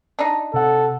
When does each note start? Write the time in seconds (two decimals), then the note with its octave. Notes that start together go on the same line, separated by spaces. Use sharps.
0.19 D4 D#4
0.54 C3 A4 F#5